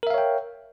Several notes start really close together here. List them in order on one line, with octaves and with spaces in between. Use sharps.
A#4 E5 F5 C#5 G5